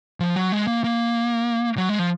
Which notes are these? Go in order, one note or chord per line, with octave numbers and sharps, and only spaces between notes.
F3
F#3
G#3
A#3
A#3
F#3
G#3
F3